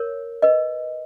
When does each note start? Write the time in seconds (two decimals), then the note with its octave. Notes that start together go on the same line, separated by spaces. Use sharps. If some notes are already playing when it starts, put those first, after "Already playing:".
Already playing: A#4 C#5
0.42 B4 D#5